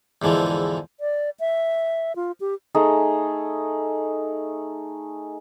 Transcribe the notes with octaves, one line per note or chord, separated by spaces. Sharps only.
E2 G#2 D3 E3 F3
D5
E5
F4
G4
A3 D#4 G#4